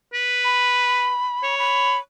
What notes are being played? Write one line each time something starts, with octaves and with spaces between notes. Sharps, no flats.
B4
B5
C#5
B5